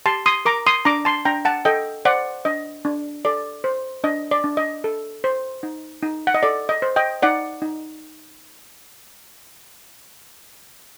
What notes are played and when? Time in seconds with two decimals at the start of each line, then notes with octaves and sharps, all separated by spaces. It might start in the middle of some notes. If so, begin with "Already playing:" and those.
0.06 G4 A5 C6
0.26 C6 D#6
0.45 A#4 A#5 D6
0.67 C6 D#6
0.85 D4 A#5 D6
1.05 A5 C6
1.25 D4 G5 A#5
1.45 F#5 A5
1.65 A4 D#5 G5
2.05 C5 D5 F#5
2.45 D4 D#5
2.85 D4
3.25 A4 D5
3.64 C5
4.04 D4 D#5
4.31 D5
4.44 D4
4.57 D#5
4.84 A4
5.24 C5
5.63 D#4
6.03 D#4
6.27 F#5
6.34 D#5
6.43 A4 D5
6.69 D#5
6.82 C5
6.96 D#5 G5
7.22 D#4 D5 F#5
7.62 D#4